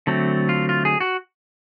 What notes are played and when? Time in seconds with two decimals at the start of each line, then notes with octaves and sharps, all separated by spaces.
0.07 D3 F#3 A3 C4
0.49 F4
0.69 F4
0.85 G#4
1.01 F#4